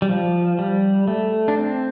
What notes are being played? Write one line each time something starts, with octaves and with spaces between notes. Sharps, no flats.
G3
F3
G3
A3
D4
C4